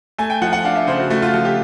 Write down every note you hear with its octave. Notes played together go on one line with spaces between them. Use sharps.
A3 G#5
G5
F3 F#5
F#5
D4 F5
E5
C#3 C5
F#4
A3 F#4
F4
F3 F#4
G4